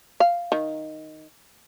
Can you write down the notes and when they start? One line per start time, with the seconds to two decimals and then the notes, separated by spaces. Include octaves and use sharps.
0.20 F5
0.52 D#3